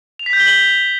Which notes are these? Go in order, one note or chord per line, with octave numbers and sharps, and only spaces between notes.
F7
B6
G6
G7
F#7